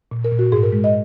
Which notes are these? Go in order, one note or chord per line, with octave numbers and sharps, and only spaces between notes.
A#2
A#4
A#2
F#4
G#2 G#4
A#4
G#3
D#5